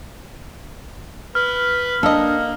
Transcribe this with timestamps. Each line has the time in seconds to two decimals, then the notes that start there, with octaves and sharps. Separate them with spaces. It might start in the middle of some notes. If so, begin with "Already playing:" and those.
1.35 B4 F6
2.03 A#3 D4 A4 D#5